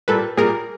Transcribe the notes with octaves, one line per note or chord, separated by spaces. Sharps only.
A#2 G3 A#3 A4 B4
A#2 G3 A#3 G#4 A#4